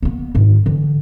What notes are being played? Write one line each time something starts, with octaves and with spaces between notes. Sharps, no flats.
A#3 B3
G#2 D#3
D3 E3